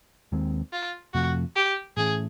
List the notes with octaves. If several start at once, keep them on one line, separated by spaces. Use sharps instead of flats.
D#2 D#3 G#3 C4
F4
F2 C3 F3 A3 F#4
G4
A2 E3 A3 C#4 G#4